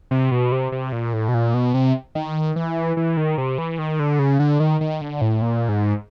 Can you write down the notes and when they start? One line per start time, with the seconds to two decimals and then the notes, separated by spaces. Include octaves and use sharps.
0.11 C3
0.32 B2
0.52 C3
0.72 C3
0.93 A#2
1.13 A2
1.28 B2
1.34 A#2
1.54 B2
1.74 C3
2.15 D#3
2.56 E3
2.97 E3
3.17 D#3
3.38 C3
3.58 E3
3.79 D#3
3.99 D3
4.19 C#3
4.39 D3
4.60 D#3
4.81 D#3
5.01 D3
5.21 A2
5.42 A#2
5.69 G#2